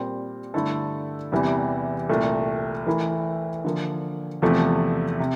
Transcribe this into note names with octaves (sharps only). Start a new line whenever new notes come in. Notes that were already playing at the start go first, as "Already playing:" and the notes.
Already playing: A#2 G3 C4
G2 D3 A3 E4 A4
E2 C3 E3 G3
C2 A#2 A3
E3 A3 E4 A#4
D3 F3 A#3
E2 C3 F3 A3
C3